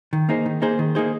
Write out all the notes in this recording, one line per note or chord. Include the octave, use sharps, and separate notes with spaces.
D#3
A#3 D#4 G#4 C5
D#3
A#3 D#4 G#4 C5
D#3
A#3 D#4 G#4 C5